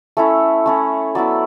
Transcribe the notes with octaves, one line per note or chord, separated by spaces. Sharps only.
A3 C#4 E4 C#5
A3 C#4 E4
F#3 B3 E4 D5